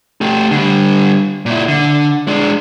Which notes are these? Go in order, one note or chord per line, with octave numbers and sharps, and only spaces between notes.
A3 G4
D3 G3
A#2 E4
D3
G#3 D4